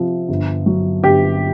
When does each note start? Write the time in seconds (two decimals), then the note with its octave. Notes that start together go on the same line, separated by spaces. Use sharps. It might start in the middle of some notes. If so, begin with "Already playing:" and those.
Already playing: C3 F3
0.29 G1
0.66 F#3
1.03 G1 G4